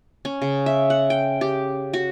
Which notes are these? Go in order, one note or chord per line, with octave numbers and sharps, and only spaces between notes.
C#4
C#3
E5
F#5
G5
G4
F#4